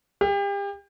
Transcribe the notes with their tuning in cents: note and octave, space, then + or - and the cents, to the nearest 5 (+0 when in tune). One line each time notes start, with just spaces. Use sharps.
G4 +35